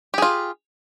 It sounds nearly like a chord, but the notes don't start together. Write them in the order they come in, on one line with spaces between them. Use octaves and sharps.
G4 G#4 F4